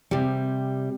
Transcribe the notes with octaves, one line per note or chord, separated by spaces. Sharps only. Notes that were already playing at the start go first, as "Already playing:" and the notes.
C3 G3